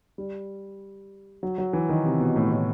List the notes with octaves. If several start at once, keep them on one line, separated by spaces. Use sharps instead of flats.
G3
F#3
F#3
E3
D#3
C3
B2
A2
A2